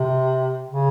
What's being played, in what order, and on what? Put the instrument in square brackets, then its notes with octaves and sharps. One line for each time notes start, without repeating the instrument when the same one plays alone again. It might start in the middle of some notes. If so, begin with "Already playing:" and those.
Already playing: [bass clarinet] C3
C#3